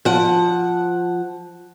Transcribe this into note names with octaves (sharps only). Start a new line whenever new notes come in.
F3 F#5